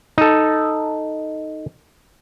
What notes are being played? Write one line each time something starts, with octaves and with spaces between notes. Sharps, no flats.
D#4 A4